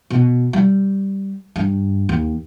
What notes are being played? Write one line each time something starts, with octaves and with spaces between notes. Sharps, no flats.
B2
G3
G2
D#2